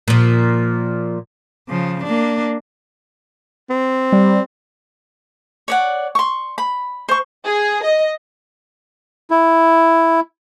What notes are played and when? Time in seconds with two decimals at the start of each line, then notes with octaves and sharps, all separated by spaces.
0.08 A#2 F3
1.69 C#3 F3
2.03 A#3 D4
3.70 C4
4.12 G3
5.68 C#5 D5 F#5
6.15 C6 C#6
6.58 B5
7.09 C5 C#6
7.45 G#4
7.84 D#5
9.31 E4